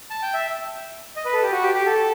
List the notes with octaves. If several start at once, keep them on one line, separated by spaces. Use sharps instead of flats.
A5
G5
E5
D#5
B4
A4
G4
F#4
G4
G4
A4